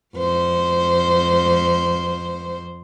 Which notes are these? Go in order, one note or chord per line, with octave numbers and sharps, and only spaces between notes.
F2 C5